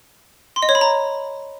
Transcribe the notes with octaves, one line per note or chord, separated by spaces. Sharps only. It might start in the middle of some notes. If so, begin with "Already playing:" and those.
C6
D#5
C#5
B5
A#5